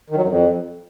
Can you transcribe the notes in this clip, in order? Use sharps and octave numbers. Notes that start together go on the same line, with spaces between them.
D#3
F#3
F#2
F2